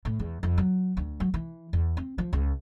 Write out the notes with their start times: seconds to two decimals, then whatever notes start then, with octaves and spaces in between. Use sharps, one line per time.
0.05 A2
0.20 E2
0.43 F2
0.58 F#3
0.97 D2
1.20 F#3
1.34 E3
1.73 E2
1.97 C4
2.18 F3
2.33 C#2